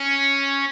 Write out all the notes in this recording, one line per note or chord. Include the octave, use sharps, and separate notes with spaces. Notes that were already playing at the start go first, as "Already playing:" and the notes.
Already playing: C#4